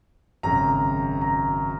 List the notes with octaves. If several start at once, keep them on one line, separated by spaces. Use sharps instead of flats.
G#1 F#2 C#3 A#5
A#5